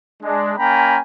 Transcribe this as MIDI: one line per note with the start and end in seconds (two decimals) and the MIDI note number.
0.23 0.52 56
0.23 0.52 62
0.58 1.00 58
0.58 1.00 61
0.58 1.00 79
0.58 1.00 80
0.58 1.00 82
0.58 1.00 83